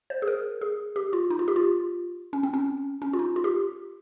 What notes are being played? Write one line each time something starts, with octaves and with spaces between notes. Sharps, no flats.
C5
G#4
A#4
G#4
G4
F4
D#4
F4
G4
F4
C#4
C4
C#4
C#4
F4
D#4
F4
G4